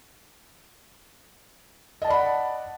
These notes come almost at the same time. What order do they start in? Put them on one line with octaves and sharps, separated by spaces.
D#5 A5 D5 B5 F#5